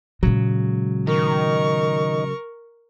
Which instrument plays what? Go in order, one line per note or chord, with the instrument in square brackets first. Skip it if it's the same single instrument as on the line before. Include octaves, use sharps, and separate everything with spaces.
[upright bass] A#2 G#3 [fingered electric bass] C#3 F#3
[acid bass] D#3 [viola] A#4 C#6